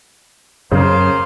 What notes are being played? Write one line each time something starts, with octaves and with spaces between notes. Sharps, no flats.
F#2 C#3 A#3 C5 F5